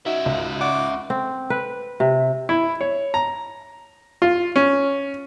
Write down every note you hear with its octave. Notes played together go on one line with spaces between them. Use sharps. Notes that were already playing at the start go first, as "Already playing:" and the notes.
C#4 D#4 F#4 E5
C#2
F#5 C#6 D6
C4
B4
C3
E4
C#5
A#5
F4
C#4